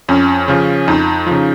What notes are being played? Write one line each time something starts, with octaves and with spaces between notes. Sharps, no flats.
F2 C#4
C#3 F3
F2 D#4
C#3 F3